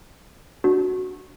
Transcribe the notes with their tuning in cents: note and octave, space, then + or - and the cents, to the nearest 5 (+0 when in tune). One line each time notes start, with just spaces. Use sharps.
D4 +0 F#4 +0